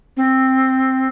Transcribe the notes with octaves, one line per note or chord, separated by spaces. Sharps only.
C4